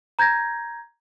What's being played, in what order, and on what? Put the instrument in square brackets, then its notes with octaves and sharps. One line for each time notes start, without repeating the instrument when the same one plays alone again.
[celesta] A#5 G6 G#6 A#6